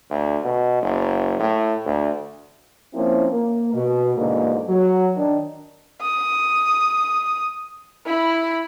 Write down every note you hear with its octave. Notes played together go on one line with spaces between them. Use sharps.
D2
B2
F#1
A2
D2
F3 A#3 C4 C#4 E4
A#3
B2
E2 G#2 B2 D3 A#3
F#3
D#3 D4
D#6
E4 B5